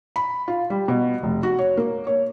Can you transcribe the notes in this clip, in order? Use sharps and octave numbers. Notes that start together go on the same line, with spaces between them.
B5
F4
G3
B2
F1
F#4
C#5
A#3
C#5